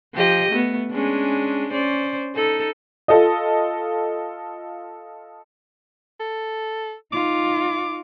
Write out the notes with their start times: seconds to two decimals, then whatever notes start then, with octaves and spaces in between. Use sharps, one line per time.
0.15 F3 G4 D#5
0.50 A3 B3
0.91 G#3 C#4 D4
1.72 C#4 C5 D5
2.35 D#4 A4
3.08 F4 A4 D#5
6.20 A4
7.13 D#4 F4 D6